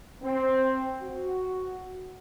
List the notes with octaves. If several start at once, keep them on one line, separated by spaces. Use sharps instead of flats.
C4
F#4